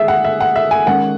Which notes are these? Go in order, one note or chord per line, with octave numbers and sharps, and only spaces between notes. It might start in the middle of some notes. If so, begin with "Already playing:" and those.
Already playing: D#3 G#3 G#4 E5
F#5
E5
F#5
E5
G#5
D#3 G#3 C#4 F#5